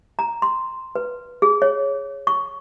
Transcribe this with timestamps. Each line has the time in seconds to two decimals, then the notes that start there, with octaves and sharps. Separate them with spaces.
0.19 A#5
0.42 C6
0.95 B4
1.42 G#4
1.62 C#5
2.27 C#6